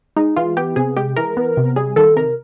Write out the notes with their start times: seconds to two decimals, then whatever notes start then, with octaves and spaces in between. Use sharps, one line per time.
0.16 G#3 D#4
0.36 E3 F4
0.57 B3 G4
0.76 C3 G#4
0.97 G#3 G4
1.16 E3 A#4
1.37 B3
1.57 C3
1.76 G3 G#4
1.96 D#3 A4
2.16 C3 A#4